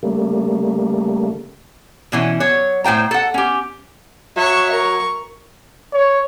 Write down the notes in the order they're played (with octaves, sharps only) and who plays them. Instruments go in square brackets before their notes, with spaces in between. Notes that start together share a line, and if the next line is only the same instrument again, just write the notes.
[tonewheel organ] C#3 G3 A3 A#3
[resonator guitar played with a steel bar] B2 E3 C#4
F#3 C#5
A2 C5 G5 A#5
A4 F#5
C#4 G4
[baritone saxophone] F#3 [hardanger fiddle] E5 C#6
[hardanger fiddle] A#4 C#6
[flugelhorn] C#5